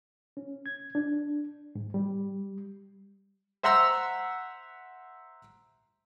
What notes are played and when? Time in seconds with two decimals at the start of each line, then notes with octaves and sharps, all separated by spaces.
0.37 C#4
0.66 G#6
0.95 D4
1.75 G#2
1.94 G3
3.63 C5 E5 F#5 A#5 C6 E6